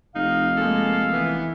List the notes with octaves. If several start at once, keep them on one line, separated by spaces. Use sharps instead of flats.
F1 D#4 F5
G#3 A#3 A4
E3 B3